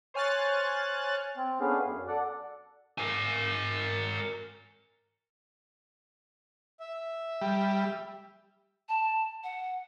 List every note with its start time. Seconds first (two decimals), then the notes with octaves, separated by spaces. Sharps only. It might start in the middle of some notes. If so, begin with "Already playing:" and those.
0.14 C5 C#5 G#5 F6 F#6 A6
1.37 C4
1.60 A3 B3 C#4 D4 G#4 F5
1.85 F#2
2.08 A4 D5 F#5
2.98 A#4 G#5
6.80 E5
7.41 G3
8.89 A5
9.44 F#5